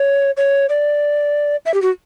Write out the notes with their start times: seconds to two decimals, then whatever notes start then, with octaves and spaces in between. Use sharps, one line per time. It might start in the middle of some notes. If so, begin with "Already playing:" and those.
Already playing: C#5
0.37 C#5
0.69 D5
1.66 E5
1.74 G4
1.82 F#4